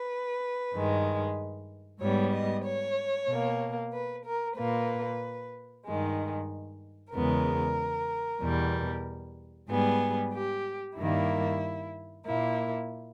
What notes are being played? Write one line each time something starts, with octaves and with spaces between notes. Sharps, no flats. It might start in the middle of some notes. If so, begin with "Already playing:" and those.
Already playing: B4
G2 D#3 G#3
G#2 G3 B3 C#5
D#5
C#5
B2 A#3
B4
A#4
A#2 A#3 B4
G2 D#3 G#3
E2 C#3 G#3 B3 A#4
E2 B2 G3
G#2 G3 B3 G#4
G4
G2 D#3 G3 A#3 E4
A#2 A#3 E4